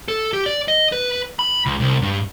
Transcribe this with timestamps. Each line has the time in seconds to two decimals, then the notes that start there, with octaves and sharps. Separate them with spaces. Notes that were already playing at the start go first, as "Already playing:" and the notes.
0.08 A4
0.33 G4
0.46 D5
0.68 D#5
0.92 B4
1.39 B5
1.66 C#2
1.80 C2
2.02 G2